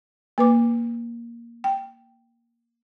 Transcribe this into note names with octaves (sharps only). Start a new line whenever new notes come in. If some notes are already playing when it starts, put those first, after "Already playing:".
A#3 B4 D6
G5